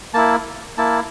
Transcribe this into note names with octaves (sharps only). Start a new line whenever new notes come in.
A#3 E4 A5
A#3 E4 A5